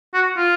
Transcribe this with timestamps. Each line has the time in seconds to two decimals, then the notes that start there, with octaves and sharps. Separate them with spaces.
0.14 F#4
0.37 F4